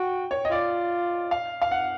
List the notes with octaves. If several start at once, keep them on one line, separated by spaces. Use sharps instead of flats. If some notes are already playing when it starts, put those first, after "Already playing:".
Already playing: F#4 G5
C#5
D#5
F4 D5
F5
F5
F#5